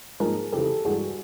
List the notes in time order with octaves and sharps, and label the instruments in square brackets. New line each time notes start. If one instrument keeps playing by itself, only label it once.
[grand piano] G#2 F3 A#3 D#4 [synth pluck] G#4 A#4
[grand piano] F2 C#3 E3 [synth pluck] G4 A4
[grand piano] G2 E3 G#3 [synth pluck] F#4 G#4